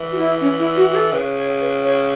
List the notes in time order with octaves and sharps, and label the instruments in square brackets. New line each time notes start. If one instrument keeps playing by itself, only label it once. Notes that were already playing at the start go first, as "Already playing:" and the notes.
Already playing: [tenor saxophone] E3
[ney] F#4
E4
C#4
E4
F#4
F#4
A4
[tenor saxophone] C#3 [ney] B4
[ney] C#5
B4
C#5